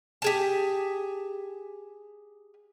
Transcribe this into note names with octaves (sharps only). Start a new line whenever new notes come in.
G4 G#4 A5